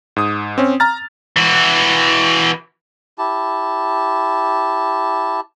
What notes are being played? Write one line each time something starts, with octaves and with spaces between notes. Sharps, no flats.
G#2 D#6
C4 C#4
A#5 F6 A6
E3 F#4
E4 G4 A5